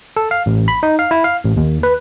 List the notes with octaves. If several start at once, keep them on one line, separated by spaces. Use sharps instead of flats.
A4
F5
A1
B5
D#4
F5
E4
F5
A1
D#2
B4